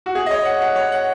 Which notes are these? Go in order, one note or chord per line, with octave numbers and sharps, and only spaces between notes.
F#4
G#4
D#5
C#5
F#5
F#5
C#5
F#5